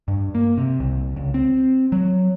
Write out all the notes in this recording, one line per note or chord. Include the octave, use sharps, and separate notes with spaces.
G2
A#3
C3
C2
C#2
C4
F#3